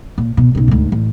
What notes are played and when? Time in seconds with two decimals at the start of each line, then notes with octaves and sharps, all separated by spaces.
0.18 A#2
0.37 B2
0.55 B1 C#3
0.68 D2 G#2
0.92 A1